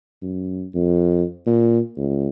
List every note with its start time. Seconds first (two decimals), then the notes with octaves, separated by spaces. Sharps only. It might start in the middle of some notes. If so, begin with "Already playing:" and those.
0.22 F#2
0.74 F2
1.46 A#2
1.97 C#2